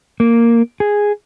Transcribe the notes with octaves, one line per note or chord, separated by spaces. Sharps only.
A#3
G#4